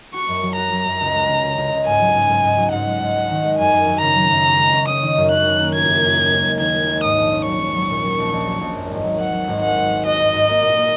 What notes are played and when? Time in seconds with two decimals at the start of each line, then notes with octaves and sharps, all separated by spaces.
0.14 F#4 C#6
0.28 F#2
0.43 F#3
0.57 F#4 A#5
0.72 F#3
0.87 F#2
1.01 C#2
1.15 G#3
1.29 C#3
1.43 C#2
1.58 C#2
1.72 C#2
1.86 G#2 G#5
2.01 F#3
2.15 G#2
2.29 G#2
2.44 G#2
2.58 F#3
2.72 G#2 F#5
2.87 G#3
3.01 G#2
3.16 G#3
3.31 D#3
3.44 G#3
3.59 F#2 G#5
3.73 F#2
3.87 F#3
4.02 C#3 A#5
4.17 F#3
4.31 F#2
4.45 C#4
4.59 G#3
4.73 C#4
4.88 C#4 D#6
5.03 D#3
5.17 F#2
5.31 C#4 F#6
5.46 C#3
5.60 A#3
5.74 A#3 G#6
5.88 F#2
6.03 F#2
6.18 D#2
6.32 G#3
6.46 G#3
6.60 D#2 G#6
6.74 G#3
6.90 G#3
7.04 G#2 D#6
7.18 A#1
7.32 C#4
7.47 F#3 C#6
7.61 C#4
7.76 F#3
7.90 A#2
8.04 F#3
8.18 A#1
8.32 A#1
8.47 F#3
8.61 A#1
8.76 F#2
8.91 G#1
9.04 F#3
9.19 F#3 F#5
9.34 F#3
9.48 G#1
9.62 G#3 F#5
9.76 G#2
9.91 G#3
10.05 F#4 D#5
10.19 G#2
10.34 G#2
10.48 A#3
10.62 A#2
10.77 A#3